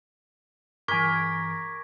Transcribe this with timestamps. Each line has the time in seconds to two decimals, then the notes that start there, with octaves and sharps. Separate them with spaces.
0.88 G2 E3 A#4 G#5 C#6 D6 G#6 B6